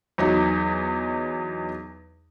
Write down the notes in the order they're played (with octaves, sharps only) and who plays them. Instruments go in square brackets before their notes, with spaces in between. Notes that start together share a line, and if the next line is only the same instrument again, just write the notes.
[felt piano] E2 F#3 D#4